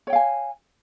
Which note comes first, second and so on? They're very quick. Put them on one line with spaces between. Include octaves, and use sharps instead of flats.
C#5 G5 F5 G#5